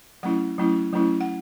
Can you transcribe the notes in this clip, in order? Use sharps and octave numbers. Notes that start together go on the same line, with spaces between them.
F#3 A3 C#4 E4 F#5
F#3 A3 C#4 E4
F#3 A3 C#4 E4
F#5